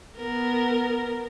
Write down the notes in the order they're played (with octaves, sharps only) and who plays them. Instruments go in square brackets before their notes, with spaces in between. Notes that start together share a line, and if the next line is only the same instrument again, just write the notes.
[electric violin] B3 A#4